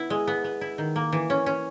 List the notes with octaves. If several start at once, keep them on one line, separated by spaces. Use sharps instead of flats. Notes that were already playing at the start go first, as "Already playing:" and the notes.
Already playing: B3 E4
G#3
B3
B3
E4
D#3
A#3
E3
C#4
C#4